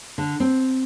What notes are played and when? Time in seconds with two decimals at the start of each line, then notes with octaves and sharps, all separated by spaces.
0.18 D3
0.40 C4